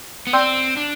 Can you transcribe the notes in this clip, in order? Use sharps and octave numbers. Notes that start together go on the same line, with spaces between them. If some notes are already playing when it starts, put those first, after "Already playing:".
B3
C4 D5 G5 C6 E6 G6
D4